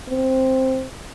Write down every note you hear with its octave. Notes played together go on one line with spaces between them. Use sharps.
C4